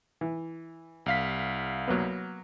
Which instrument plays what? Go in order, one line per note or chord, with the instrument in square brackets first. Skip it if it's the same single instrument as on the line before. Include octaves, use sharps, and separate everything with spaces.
[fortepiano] E3
[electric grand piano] C2 F5 B6
[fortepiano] F#3 A#3 B3